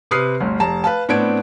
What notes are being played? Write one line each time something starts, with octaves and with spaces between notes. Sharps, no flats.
C3 B4 D#6 F6 C7
G1 D2
F1 A5 A#5 E7
B4 F5 A5
A2 B3 C4 D4 G#6 D7